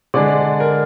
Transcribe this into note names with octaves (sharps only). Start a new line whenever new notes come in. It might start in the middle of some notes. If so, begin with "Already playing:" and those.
D3 G#3 D4 D5
A#4